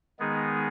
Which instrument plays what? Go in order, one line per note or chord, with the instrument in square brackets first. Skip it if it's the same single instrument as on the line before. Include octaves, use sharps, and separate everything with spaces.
[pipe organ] D#3 G#3 B3 D#4 G#4